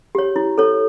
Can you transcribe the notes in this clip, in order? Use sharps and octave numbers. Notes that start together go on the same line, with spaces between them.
G4 C#5
E4
A4 C#5